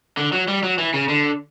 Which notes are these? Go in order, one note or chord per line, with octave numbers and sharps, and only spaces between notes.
D3
F#3
G3
F#3
E3
C#3
D3